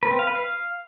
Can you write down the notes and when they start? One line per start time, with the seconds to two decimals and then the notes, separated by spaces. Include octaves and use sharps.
0.03 B4
0.11 C4
0.19 F5
0.27 B4
0.35 F5